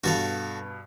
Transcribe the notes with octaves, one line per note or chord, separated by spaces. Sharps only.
G2 B2 F#4 A4 F5